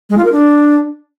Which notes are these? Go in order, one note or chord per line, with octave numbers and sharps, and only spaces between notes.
G#3
F4
A#4
D4